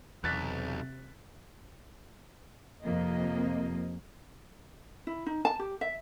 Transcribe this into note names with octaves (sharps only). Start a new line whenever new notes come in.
B1 E2 C3 F#6 A6 B6
F2 C3 A#3 D#5
E4
D#4
A5
G4
E5